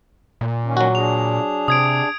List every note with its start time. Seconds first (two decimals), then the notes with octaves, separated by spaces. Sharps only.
0.41 A#2
0.64 D#3 A#3 C#4
0.77 F#3 F#4
0.95 D4 G#4 F7
1.68 C3 D#6 G#6 D7